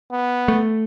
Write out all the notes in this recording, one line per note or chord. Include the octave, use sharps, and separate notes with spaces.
B3
A3